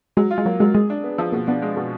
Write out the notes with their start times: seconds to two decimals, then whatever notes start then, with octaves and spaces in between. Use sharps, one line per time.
0.17 F#3 G#3
0.31 F4
0.38 G#3
0.46 F#3 A#3
0.60 F#3 G#3
0.74 G#3 G#4
0.90 D4
1.04 B3
1.18 F3
1.32 B2 A#3
1.47 B3 D4
1.62 G#3
1.77 B2